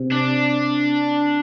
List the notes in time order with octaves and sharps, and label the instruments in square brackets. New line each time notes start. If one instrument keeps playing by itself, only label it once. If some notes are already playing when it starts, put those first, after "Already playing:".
Already playing: [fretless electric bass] C3
[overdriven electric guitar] D4